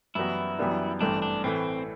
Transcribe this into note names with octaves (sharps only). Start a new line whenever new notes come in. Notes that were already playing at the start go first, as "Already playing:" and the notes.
F#2 E3 G3 B3 E4 F#4
F#2 E3 G3 B3 D4
A1 G2 E3 A3 C4 D4
D4
A2 E3 A3 C4